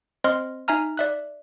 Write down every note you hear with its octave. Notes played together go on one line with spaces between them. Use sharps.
C4 C5 D#5 C6 F6
D#4 E5 G#5 A#5 F6
D5 E5 F#6